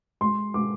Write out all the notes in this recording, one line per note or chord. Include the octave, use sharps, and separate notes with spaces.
G#3 C6
G#3 D6